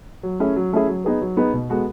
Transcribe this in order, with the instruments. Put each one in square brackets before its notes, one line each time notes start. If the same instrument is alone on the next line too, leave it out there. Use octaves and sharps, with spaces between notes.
[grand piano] F#3
A3 C#4 E4 G#4
F#3
A3 C#4 E4 G#4
F#3
B3 D#4 G#4 B4
F#3
B3 D#4 G#4 B4
B2
G#3 B3 F#4 A4